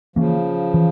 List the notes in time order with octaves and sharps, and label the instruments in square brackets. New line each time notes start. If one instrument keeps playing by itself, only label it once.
[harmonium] C#3 F3 [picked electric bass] E3 A#3 C#4
[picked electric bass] E3